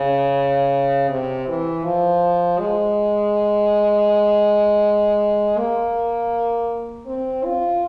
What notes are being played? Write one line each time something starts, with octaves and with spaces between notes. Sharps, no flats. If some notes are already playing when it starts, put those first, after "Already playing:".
Already playing: C#3
C3
E3
F3
G#3
A#3
C4
F4